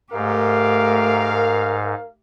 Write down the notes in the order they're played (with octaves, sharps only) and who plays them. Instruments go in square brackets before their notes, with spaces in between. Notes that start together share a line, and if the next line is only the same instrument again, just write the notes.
[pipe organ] G#2 [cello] A3 G4 [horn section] A#4 F5